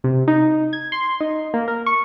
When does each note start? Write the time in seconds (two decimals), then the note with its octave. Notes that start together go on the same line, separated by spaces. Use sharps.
0.04 C3
0.28 D#4
0.73 G#6
0.92 C6
1.20 D#4
1.54 A#3
1.68 A#4
1.86 C#6